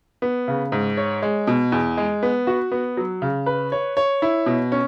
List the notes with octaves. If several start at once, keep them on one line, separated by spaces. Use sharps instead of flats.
B3
C#3
G#2
C#5
G#3
B2
E2
G#3
B3
F#4
B3
F#3
C#3
B4
C#5
C#5
E4
B2
C#4